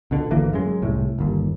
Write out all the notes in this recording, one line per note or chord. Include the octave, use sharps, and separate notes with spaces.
C#2 B2 D3
G#1 D3 E3 A#3
F#2 G#3
C2 A2
G1 D#2